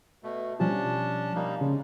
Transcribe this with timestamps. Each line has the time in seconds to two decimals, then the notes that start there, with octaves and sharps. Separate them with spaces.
0.23 B2 A3
0.60 B2 F3 G3 C#4 D4 A5
1.35 G3 A#3 D#4
1.61 C#3 G#3